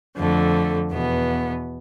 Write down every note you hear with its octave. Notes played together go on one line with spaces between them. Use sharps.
F2 D3 A3
E2 B2 B3